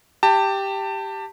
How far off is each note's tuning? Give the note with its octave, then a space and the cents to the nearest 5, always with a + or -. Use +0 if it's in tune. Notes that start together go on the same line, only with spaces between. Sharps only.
G4 +0 A5 +25